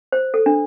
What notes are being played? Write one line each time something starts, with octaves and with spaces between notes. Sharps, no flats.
C5
A4
D4